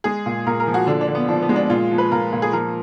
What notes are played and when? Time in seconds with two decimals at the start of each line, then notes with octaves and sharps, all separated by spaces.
0.04 G#3 G#4
0.26 A#2
0.46 A#2 A#4
0.60 A#4
0.67 F3
0.74 F#4
0.87 D3 D4
1.01 D4
1.07 D3
1.15 B3
1.28 F3 D4
1.42 B3
1.49 G#3
1.56 D4
1.70 A#2 F4
1.91 F3
1.98 B4
2.12 A#2 A#4
2.33 A#2
2.42 G#4
2.53 F3 A#4